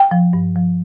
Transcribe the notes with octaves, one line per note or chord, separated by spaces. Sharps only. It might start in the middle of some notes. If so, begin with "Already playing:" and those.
Already playing: G5
F3
G2
F3